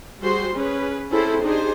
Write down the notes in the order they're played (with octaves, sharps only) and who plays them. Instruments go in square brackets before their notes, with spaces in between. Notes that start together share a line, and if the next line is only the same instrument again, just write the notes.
[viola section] G3 F#4 G#4 C5 C6
C#4 G#4 B4
C4 C#4 E4 G#4 A4 C5
D4 D#4 G4 G#4 C5